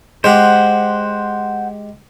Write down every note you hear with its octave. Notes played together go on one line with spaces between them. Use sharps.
G#3 G4 C5 F#5